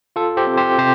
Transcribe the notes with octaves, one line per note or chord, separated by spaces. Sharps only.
F4 A4
G4 C5
C4
G4 C5
C3 G4 C5